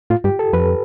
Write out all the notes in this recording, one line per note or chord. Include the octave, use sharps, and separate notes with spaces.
A2 F4
G2 G4
A4
F2 B4